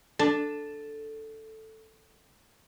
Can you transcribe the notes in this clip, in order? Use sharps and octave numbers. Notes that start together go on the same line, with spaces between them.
D4 A4